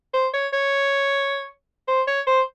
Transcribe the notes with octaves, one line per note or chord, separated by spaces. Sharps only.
C5
C#5
C#5
C5
C#5
C5